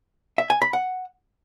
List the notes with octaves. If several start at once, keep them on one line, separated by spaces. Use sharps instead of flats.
E5
G#5
B5
F#5